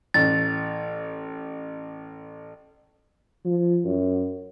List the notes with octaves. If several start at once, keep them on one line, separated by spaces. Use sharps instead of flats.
A1 A6
F3
F#2